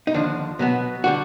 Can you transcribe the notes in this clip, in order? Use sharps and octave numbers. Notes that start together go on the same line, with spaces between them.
D#4
D#2 D3 F3 D4
B2 F#3 B3
D3 G3 F#4